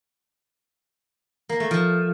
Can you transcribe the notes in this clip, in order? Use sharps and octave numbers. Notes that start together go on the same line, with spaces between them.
A#3
A3
F3